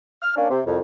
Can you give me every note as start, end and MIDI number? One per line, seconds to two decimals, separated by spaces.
0.22 0.33 89
0.36 0.49 58
0.36 0.49 61
0.36 0.49 62
0.50 0.60 48
0.66 0.80 36
0.66 0.80 41